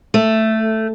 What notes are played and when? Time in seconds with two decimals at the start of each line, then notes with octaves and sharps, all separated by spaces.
0.14 A3